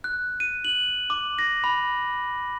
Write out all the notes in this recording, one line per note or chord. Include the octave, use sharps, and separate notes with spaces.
F#6
D#7
F#7
D6
A#6
B5